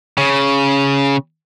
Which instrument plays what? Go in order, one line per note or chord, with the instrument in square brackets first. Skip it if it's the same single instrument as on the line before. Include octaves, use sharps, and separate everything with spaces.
[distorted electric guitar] C#3